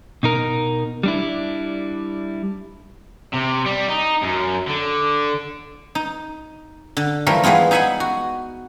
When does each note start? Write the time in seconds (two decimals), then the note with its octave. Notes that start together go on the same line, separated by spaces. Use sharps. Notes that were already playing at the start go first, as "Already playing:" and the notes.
0.23 B2 D#4 A#4
1.03 G3 D4 E4
3.33 C3
3.66 G3
3.89 D#4
4.23 F#2
4.68 D3
5.95 D#4
6.97 D3
7.26 E3 F3 G3 A3 A#4
7.43 E3 G3 G#3 B3 F4
7.71 D#4 G#4 E5 F#5 G#5 B5
8.00 F#4